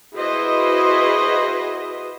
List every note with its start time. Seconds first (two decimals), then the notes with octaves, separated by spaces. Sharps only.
0.15 E4 F#4 G#4 B4 C5 D#5